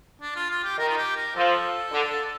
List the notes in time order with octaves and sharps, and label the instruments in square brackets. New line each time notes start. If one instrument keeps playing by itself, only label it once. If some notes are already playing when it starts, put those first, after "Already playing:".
[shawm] D4
F4
F4
G4
[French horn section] D#3 [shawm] A#4
[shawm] F4
G4
A#4
[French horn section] F3 [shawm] A4
[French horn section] D3